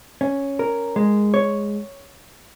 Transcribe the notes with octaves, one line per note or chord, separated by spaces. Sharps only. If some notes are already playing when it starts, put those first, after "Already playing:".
C#4
A#4
G#3
C#5